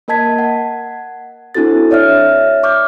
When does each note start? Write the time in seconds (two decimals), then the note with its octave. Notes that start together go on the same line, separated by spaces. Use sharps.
0.08 A#3 A#4 D#5 A5 G#6 B6
0.39 F#5
1.55 C4 D4 E4 F#4 A4 A6
1.91 C#5 D5 E5 F6
2.63 C#6 D6 F6 G6